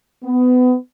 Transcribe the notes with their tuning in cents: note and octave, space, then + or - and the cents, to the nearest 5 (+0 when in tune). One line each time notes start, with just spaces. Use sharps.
B3 +25